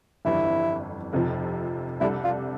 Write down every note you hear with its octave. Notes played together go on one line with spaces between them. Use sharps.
G1 F2 E3 G3 E4
F1 F2 C3 F3
C2 C3 G3 D4 E4 A4
F4